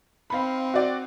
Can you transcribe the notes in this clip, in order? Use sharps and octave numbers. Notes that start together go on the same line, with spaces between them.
C4 D#4 F5 B5
F#4 D5 G5